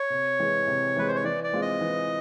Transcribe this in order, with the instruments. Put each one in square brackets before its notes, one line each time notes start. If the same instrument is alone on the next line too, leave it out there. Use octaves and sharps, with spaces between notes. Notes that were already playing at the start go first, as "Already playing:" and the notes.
Already playing: [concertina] C#5
[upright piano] C3
E3 G#3
C3
[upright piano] E3 G#3 [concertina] B4
[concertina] C5
C#5
[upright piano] E3 [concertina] D5
[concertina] D5
[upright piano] G#3 C4 F4
[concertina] D#5
[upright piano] E3